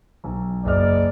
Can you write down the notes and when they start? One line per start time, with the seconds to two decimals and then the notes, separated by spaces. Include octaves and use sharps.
0.24 B1
0.65 F#1 D5 D#5 F6